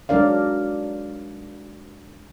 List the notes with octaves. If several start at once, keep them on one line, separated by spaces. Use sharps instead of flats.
F#3 G#3 D4 A#4 D5 F5